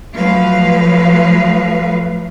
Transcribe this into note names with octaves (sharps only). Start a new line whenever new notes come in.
F3 F#3 A3 B4 F5